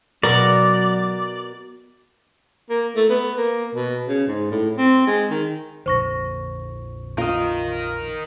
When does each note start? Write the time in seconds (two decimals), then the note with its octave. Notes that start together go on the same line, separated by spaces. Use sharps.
0.23 B2 F#3 F#4 A#4 D5
2.70 A#3
2.96 A3
3.10 B3
3.38 A#3
3.75 B2
4.08 C#3
4.28 G#2
4.51 A2
4.77 C4
5.07 G#3
5.31 D#3
5.86 A#1 F2 D3 C5 C#6 A#6
7.18 F4 A#4 D#5